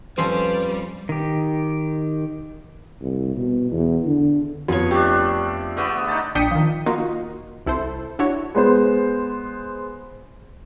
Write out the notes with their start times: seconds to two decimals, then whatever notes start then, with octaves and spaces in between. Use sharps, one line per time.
0.18 F2 F3 G3 C#4 B4 C5
1.09 D#3 G4
3.01 C2
3.37 B2
3.72 E2
4.06 D3
4.68 F2 B3 C#5
4.91 A3 D4 G4
5.77 D3 A3 B3
6.08 D#4 A5
6.35 A#1 D4 G5 D#6 B6 C#7
6.51 D#3 F3
6.86 A#3 D#4 F4 F#4
7.66 C2 E4 A4 C5
8.19 D4 E4 F#4 C#5
8.54 G#3 B3 C5